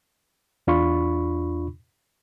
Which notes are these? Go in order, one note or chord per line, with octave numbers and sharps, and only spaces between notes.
E2 D4 F4 B5 C#6